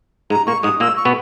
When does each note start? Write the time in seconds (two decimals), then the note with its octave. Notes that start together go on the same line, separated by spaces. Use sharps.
0.30 G#2 G#3 A#5
0.47 A#2 A#3 C#6
0.63 G#2 G#3 D#6
0.80 A#2 A#3 E6
0.97 C#6
1.05 B2 B3